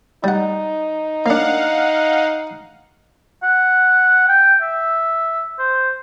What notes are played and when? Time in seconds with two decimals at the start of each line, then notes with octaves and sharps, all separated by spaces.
0.24 G3 D#4 F#5
1.26 A#3 D4 F5 F#5
3.43 F#5
4.28 G5
4.62 E5
5.59 C5